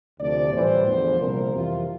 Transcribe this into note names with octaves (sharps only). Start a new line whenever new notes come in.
D2 C3 F3 D5
A2 E3 G3 C5
E2 D3 F3
C2 A#2 F3 A#4
F2 C3 E3 F4